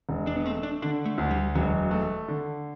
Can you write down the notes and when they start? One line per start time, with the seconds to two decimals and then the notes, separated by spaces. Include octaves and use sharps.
0.09 E1
0.27 D4
0.36 B3
0.45 A3 C4
0.63 D4
0.82 D3 D4
1.06 A3
1.18 D2
1.31 G3
1.55 E1 F#3
1.91 A3
2.28 D3